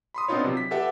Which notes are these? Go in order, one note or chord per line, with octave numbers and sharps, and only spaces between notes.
B5 C6 D#6
B3 C4 D4 D#4 F4 C#5
C3 F#3
B6
G4 A4 B4 E5 F#5